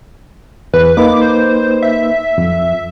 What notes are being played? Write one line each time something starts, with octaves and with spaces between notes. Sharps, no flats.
E2 B4
A#3 D#4 B4 D6
C5
E5
F2